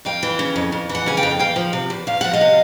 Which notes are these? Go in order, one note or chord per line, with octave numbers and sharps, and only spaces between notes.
F2 F5 G5
E3
C#3
F2
F2
E3
F#5 G#5
C#3 G#5
F5 G5
F2
E2 F5 G5
F3
C3
E2
E2 F5
F3 F#5
D#5 F5
C3